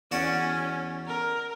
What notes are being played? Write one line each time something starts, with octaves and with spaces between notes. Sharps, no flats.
E2 C#4 F#4 D5
A#4